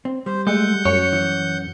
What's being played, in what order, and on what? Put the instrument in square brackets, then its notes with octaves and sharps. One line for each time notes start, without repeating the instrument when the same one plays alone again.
[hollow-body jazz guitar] C4
[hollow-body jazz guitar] G3 [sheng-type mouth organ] C5
[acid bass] G#3 [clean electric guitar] A3 [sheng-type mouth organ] F#5 G6
[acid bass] F#2 [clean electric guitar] C#5
[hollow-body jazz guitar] E3